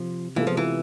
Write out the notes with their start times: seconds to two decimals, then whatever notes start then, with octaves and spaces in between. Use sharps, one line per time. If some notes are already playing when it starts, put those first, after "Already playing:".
Already playing: C3 F3
0.36 C3 E3 G#3 B3 F4 A4
0.47 F3
0.57 E3